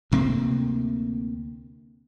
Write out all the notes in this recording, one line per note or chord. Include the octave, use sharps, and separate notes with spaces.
D2 C3 A#3 C4